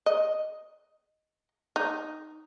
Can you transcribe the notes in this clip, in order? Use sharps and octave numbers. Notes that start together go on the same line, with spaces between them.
D#5
D#4